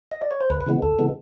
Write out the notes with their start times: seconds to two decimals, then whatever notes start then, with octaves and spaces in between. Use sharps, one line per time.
0.12 D#5
0.22 D5
0.31 C#5
0.41 C5
0.50 D2 B4
0.61 B4
0.66 C#3 E3 G#3 B3
0.82 D2 A4
0.99 C#3 E3 G#3 B3